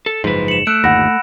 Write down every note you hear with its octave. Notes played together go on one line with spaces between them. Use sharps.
A4
F#1 G#2 F3 B4
C#7 E7 F#7
A3 E6 F#6 D7
G1 D#2 F#5 B5 A#6